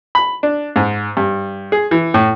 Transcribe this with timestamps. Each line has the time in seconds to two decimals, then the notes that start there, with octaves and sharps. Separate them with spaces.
0.15 B5
0.43 D4
0.76 G#2
1.17 G2
1.72 G#4
1.91 E3
2.14 A2